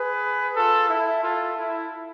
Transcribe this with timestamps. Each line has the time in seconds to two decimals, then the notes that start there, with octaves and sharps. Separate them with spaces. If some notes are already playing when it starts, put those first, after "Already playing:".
Already playing: G#4 B4
0.56 F4 A4
0.90 E4
1.23 F4 A4
1.58 E4